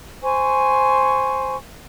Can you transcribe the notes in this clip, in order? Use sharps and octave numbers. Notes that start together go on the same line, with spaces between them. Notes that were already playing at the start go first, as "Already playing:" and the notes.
C5 G#5 C#6